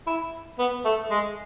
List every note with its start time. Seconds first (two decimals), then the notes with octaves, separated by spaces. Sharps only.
0.07 E4
0.59 B3
0.85 A3
1.11 G#3